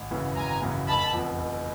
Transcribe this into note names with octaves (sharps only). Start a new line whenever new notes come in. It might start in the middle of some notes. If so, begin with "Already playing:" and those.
Already playing: G#1
F#2 C#3 E3
G#1 G#5 A#5
F#2 C#3 E3
F1 A5 B5
E2 C3 F3
F1